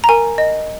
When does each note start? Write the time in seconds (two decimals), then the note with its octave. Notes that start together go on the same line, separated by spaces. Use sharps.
0.04 A#5
0.09 A#4 G#5
0.38 D#5